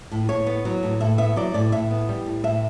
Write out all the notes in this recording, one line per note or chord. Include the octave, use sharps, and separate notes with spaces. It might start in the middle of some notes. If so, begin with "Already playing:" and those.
A2
A2 C#5
B3
F#3
A2
A2 E5
B3 E5
F#3 D5
A2 D5
A2 E5
B3
G3
A2
A2 E5